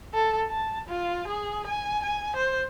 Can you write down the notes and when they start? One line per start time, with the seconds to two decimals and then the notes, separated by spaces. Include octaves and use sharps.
0.14 A4
0.50 A5
0.88 F4
1.28 G#4
1.67 G#5
2.03 G#5
2.36 C5